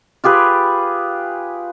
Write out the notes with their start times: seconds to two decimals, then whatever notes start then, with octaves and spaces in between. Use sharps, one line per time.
0.24 F4 G4 G#4 B4